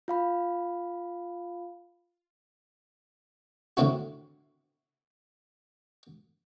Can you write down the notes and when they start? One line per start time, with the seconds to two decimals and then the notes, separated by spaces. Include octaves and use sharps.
0.08 F4 F5 B5
3.77 A2 D3 D#3 C4 E4 F#4